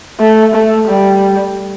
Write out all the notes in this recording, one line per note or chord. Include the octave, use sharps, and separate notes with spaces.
A3
A3
G3